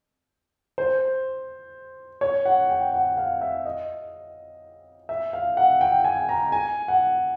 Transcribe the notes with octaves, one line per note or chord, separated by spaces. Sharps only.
C5
C#5
F#5
G5
F#5
F5
E5
D#5
E5
F5
F#5
G5
G#5
A#5
G#5
F#5